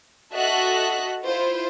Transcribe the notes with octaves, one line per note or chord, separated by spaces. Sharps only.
F#4 A4 D#5 E5 F#6
E4 F4 C5